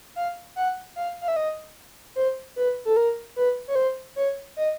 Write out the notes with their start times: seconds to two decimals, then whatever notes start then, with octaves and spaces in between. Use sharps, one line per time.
0.16 F5
0.56 F#5
0.96 F5
1.21 F5
1.28 E5
1.36 D#5
2.16 C5
2.56 B4
2.85 A4
2.97 A#4
3.36 B4
3.68 C#5
3.75 C5
4.16 C#5
4.57 D#5